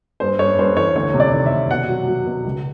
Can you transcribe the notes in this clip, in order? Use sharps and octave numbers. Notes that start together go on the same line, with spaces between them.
G2 C5
G2 C#5
G2 C5
E3 C#5
D2 C#5
C3
D5
D#3
E5
C3
B2 F#5
F#3
F#3
B2
C#2